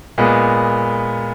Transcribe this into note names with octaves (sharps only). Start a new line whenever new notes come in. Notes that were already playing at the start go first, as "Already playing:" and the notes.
A#2 G#3 B3